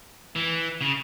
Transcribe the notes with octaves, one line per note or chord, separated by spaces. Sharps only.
E3
C#3